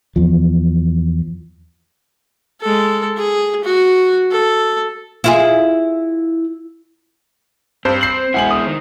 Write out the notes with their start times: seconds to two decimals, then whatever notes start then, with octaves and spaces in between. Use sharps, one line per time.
0.16 E2 F3
2.61 G#3 A4
3.17 G#4
3.64 F#4
4.31 A4
5.24 E4 F4 G#4
7.85 G2 C4 C5
8.01 C7 F#7
8.34 B2 G#3 E4 F#5 G#5 F#7
8.51 D#6
8.66 D#3